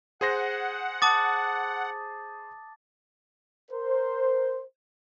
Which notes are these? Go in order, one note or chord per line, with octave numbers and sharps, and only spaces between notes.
G#4 C5 F#5 A#6
A5 D6 D#6 A6
A#4 C5